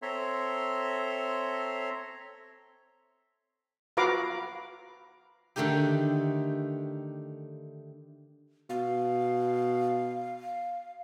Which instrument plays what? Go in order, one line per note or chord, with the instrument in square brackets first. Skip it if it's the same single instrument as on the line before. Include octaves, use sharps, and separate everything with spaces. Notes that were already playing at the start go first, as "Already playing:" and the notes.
[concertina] C4 A4 C#5 E5 A#5 C6
[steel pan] F4 F#4 B4 F5 A#5 D6
[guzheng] D3 D#3 A3 D#4 G4
[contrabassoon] B2 [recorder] F5